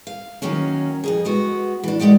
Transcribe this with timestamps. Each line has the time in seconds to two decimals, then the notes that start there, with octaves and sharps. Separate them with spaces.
0.07 F5
0.42 D#3 F#3 A#3 C#4
1.04 F2 G#2 G#4
1.25 G#3 B3 F#4
1.84 E3 D4
1.99 E2 G#3 B3 G4 D5 F#5